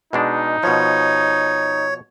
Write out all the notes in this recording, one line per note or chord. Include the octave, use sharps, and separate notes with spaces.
B2 G#3 D4 D#4
B2 F3 C#5